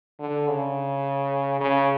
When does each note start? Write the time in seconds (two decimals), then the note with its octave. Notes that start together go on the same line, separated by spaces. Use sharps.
0.20 D3
0.48 C#3
1.61 C#3